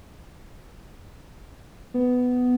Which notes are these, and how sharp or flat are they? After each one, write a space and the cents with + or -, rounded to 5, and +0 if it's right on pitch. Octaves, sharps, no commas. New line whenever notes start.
B3 +10